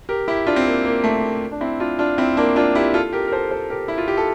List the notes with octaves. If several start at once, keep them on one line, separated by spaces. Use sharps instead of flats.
G4 A#4
E4 G4
D4 F4
C4
A#3
A#3
A3
A#3
D4
C4 E4
D4 F4
D4 F4
C4 E4
A#3 D4
D4 F4
E4 G4
F4 A4
G4 A#4
A#4
A4 C5
A4 C5
G4 A#4
E4
F4
G4
A4